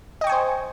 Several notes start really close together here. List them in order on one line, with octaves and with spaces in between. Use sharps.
D#5 G5 C#6 G#5 C5